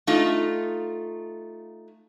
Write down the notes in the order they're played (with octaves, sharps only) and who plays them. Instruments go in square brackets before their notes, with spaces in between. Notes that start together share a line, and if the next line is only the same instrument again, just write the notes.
[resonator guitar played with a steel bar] A3 D#4 F4